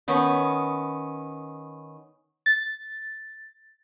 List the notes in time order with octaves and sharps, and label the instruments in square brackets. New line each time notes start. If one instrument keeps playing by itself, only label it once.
[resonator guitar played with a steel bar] D#3 B3 C#4
[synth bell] A6